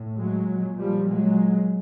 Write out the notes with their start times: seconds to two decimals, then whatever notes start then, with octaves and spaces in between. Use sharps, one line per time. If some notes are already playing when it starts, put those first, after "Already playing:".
Already playing: A2
0.17 F#3 G#3
0.48 A#2
0.79 F3 G3
1.10 F#3 G#3